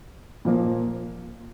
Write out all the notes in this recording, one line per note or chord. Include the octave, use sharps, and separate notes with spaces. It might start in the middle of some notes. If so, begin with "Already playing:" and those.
A#2 F3 A#3